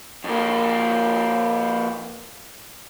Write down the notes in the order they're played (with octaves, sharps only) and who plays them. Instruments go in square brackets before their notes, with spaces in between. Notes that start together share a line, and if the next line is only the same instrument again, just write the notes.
[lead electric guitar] F2 A#3